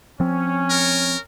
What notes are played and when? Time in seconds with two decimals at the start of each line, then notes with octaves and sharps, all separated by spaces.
0.20 F3 C4 C#4
0.70 A#4